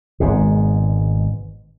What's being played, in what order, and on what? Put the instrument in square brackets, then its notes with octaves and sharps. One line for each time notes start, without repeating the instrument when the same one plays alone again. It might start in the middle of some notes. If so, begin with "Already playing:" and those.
[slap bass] G#1 G#2 B2